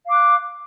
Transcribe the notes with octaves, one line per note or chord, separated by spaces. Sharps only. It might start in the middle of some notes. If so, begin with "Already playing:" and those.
F5 D6 F#6